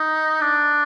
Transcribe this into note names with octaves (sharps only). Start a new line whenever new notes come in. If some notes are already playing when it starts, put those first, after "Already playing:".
Already playing: D#4
D4